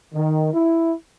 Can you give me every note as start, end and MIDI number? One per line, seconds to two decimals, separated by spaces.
0.14 0.51 51
0.53 0.93 64